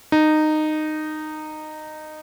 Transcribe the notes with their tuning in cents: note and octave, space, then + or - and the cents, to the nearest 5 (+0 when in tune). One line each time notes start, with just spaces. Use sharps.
D#4 -15